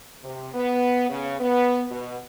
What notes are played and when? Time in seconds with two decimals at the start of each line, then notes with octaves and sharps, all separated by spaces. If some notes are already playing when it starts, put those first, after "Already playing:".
0.23 C3
0.53 B3
1.09 C#3
1.40 B3
1.91 B2